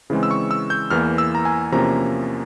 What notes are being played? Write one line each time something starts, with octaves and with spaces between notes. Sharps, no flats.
C#3 E3 G#3 C4
E6
C#6
E6
G6
E2 E3 A#3 F6
E6
A#5
G#5
E2 C3 F3 A#3 C#4 A#5